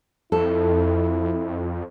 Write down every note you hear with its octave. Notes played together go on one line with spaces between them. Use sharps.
F2 E4 A4